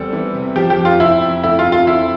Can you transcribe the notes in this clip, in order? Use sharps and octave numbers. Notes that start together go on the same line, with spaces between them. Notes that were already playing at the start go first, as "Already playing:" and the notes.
Already playing: E2 G3 C4 A4
E3
C3
F3 G4
G4
F2
F4
C3 E4
F2
A3 E4
F4
C3
F4
F3 E4